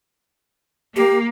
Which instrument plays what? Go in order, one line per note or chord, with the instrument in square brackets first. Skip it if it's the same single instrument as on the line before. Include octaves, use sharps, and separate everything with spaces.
[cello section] A#3 [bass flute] G4